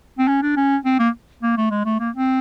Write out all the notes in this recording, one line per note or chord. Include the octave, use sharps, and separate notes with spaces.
C4
C#4
D4
C#4
C4
A#3
A#3
A3
G#3
A3
A#3
C4